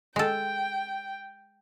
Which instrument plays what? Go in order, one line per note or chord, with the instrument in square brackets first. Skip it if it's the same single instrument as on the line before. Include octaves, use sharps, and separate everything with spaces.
[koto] G#3 A4 [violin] G5